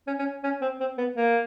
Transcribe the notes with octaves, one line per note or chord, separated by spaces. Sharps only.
C#4
C#4
C#4
C4
C4
B3
A#3